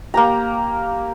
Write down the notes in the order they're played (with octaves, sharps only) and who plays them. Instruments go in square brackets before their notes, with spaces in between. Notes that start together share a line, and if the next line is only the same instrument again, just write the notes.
[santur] A#3 G4 A#5